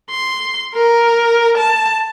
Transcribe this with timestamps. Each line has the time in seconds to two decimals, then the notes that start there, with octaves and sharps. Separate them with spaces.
0.10 C6
0.75 A#4
1.58 A5